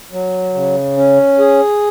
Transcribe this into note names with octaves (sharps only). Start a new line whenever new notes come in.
F#3
C#3
C#4
G#4